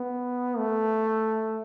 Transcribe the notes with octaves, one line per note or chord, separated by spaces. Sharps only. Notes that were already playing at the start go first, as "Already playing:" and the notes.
Already playing: B3
A3